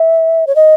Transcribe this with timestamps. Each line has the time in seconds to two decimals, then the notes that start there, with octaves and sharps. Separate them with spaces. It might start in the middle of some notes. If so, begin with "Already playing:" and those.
Already playing: E5
0.47 C#5
0.56 D#5